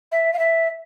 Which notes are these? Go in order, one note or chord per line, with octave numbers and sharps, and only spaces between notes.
E5
F5
E5